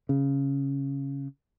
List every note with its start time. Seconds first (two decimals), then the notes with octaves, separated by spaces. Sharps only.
0.09 C#3